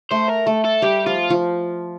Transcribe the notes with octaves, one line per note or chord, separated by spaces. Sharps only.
A3 C5
A#4
A3 A4
A4
G3 G4
F3 F4
F3